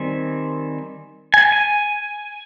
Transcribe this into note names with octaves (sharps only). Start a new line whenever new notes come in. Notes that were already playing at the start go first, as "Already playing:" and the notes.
Already playing: D#3 G3 C4 G#5
G#5
G#5